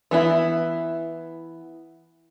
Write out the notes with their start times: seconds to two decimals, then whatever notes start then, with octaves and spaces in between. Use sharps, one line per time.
0.11 E3 B3 E4